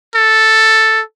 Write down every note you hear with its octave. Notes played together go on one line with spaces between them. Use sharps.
A4